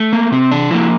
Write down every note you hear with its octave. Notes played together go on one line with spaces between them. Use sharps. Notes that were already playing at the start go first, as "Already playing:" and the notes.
Already playing: A3
A#3
C3 C4
D4
F3 A#3 E4